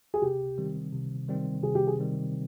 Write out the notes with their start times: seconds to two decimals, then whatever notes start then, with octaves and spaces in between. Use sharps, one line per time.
0.14 G#4
0.22 C3 G4
0.58 D#3 G3 C4
0.93 C3
1.28 D#3 G3 C4
1.63 C3 G#4
1.75 G4
1.87 G#4
1.99 D#3 G3 C4